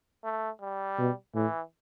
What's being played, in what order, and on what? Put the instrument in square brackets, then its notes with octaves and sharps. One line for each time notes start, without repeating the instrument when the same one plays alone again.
[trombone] A3
G3
[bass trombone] B2
[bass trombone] A2 [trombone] E3